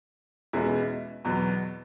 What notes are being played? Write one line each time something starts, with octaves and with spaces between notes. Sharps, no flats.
E2 B2 G#3 C#4 E4
E2 B2 F#3